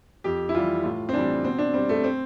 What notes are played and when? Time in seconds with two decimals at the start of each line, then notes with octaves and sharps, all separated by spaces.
0.24 F2 G4
0.49 E4
0.54 E3 G3 F4
0.84 A2 F4
1.09 C4
1.14 E3 G3 D4
1.44 B2 C4
1.59 D4
1.74 G3 C4
1.89 A3
2.04 C4